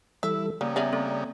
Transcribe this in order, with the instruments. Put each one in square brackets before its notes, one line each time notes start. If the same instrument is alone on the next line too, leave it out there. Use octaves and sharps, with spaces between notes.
[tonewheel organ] E3 G3 A4 [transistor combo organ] E4 [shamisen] E5 [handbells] E6
[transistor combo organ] C#3 G3 [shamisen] A#3 [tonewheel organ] D5 A#5 D#6
[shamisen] B3 C#4 G#4 [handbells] E5 A#6
[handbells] A#3 C4 A4